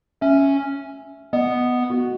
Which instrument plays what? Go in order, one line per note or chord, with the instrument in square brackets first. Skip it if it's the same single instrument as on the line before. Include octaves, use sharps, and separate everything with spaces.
[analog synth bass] C#4 [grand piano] E5
[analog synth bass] B3 [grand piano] D#5
[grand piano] F#4